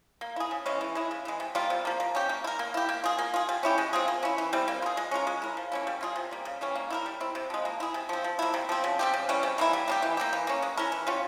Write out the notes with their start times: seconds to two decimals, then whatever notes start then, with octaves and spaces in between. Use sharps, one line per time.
0.21 A#3
0.36 E4 G#4
0.51 C#3
0.66 E3 G#3 C#4
0.81 E3
0.95 G#3 E4 G#4
1.11 C#3
1.25 E3 G#3
1.40 C3
1.55 G3 A#3 F4
1.70 C3
1.85 F3 A#3
2.00 A#3
2.15 C#4 G4
2.29 A#3
2.44 E4
2.47 A#4
2.59 A#3
2.74 E4 G4
2.89 A#3
3.04 F4 G#4
3.19 A#3
3.34 F4 G#4
3.49 G3
3.63 C#4 E4 G4
3.78 G#3
3.93 C4 F4 G#4
4.08 A#3
4.23 C#4 E4
4.38 E3
4.53 G3 C4 E4
4.68 A#3
4.82 F4 G#4
4.97 G#3
5.11 C#4 F4 A#4
5.27 G#3
5.42 E4 A#4
5.57 F3
5.72 A#3 C#4 E4
5.87 G3
6.01 A#3 F4 G#4
6.16 C3
6.31 G3 A#3
6.45 C#3
6.61 E3 G3 C#4
6.76 A#3
6.90 E4 G4 A#4
7.06 G3
7.20 C4 E4
7.35 C3
7.50 F3 G#3
7.65 A#3
7.80 E4 G#4
7.94 C3
8.09 F3 C4
8.24 F3
8.39 A#3 E4
8.54 C3
8.69 F3 C4
8.84 C#3
8.99 G3 C4 G4
9.14 C#3
9.29 E3 G3 C#4
9.43 C3
9.58 E3 A#3 E4
9.73 G3
9.88 A#3 C#4 G4
10.02 E3
10.17 A#3 E4 G4
10.33 E3
10.47 A#3 C#4
10.62 G#3
10.77 C#4 E4 A#4
10.92 E3
11.07 G3 C#4 F4